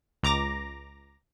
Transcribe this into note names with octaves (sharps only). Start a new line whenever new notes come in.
C#2 A#5 D6 A#6